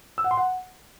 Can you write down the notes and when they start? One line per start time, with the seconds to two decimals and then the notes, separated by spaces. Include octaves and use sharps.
0.18 E6
0.24 F#5
0.31 C6
0.37 F#5